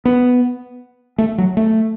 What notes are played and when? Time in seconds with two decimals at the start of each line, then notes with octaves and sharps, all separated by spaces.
0.05 B3
1.18 A3
1.38 F#3
1.57 A3